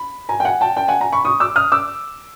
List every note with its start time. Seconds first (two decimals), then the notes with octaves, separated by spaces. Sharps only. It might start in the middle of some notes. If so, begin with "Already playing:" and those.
Already playing: B5
0.29 G#5 A#5
0.40 G5
0.45 F#5 G#5
0.61 G5 A5
0.77 G5 A5
0.88 F#5 G#5
1.00 G#5 A#5
1.13 B5 C#6
1.25 C#6 D#6
1.40 D6 E6
1.56 D#6 F6
1.72 D6 E6